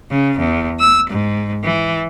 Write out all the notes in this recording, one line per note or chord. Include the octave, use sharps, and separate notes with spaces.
C#3
E2
E6
G#2
E3